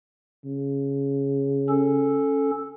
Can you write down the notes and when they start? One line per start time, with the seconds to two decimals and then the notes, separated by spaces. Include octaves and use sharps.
0.45 C#3
1.69 C#4 A4